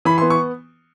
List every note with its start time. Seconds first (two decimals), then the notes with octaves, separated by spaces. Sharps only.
0.05 E3 B5
0.18 C6
0.22 B3
0.30 C#6